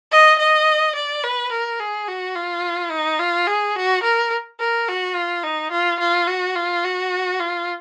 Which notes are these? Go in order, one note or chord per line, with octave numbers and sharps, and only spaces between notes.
D#5
D#5
D5
B4
A#4
G#4
F#4
F4
D#4
F4
G#4
F#4
A#4
A#4
F#4
F4
D#4
F4
F4
F#4
F4
F#4
F4